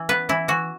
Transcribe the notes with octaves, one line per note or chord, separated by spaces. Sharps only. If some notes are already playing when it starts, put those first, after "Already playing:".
Already playing: E3
B3 B4
E3 E4
E3 F#4